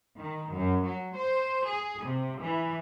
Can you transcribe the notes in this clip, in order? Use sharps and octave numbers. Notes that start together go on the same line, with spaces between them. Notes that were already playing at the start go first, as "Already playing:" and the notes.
D#3
F#2
F#3
C5
G#4
C3
E3